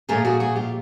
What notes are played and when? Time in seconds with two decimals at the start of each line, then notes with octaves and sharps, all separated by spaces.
0.09 A#2 F3 A3 G#4 A#4
0.25 F#4 G#4
0.40 F#4 G#4
0.55 F4 G4